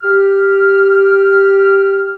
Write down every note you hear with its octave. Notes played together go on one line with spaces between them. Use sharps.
G4 F6